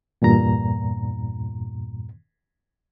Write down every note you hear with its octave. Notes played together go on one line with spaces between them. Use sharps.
E2 G2 A#2 A#5